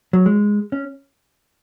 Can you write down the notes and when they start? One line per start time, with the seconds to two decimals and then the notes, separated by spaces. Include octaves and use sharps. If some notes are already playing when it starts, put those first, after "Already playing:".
0.13 F#3
0.26 G#3
0.72 C#4